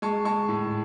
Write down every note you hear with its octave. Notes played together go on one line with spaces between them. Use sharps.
G#3 A5 C#6
G#3 A5 C#6
A2